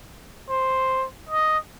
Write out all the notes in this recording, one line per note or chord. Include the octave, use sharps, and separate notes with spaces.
C5
D#5